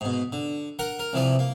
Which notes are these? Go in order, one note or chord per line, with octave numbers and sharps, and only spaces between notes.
G#2 B2
D3
A#4 F#5 A#5
A#4
C2 E3 F3 D5
A#3